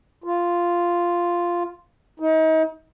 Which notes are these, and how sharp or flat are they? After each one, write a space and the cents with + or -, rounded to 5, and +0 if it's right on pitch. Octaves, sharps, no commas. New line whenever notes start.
F4 -5
D#4 +35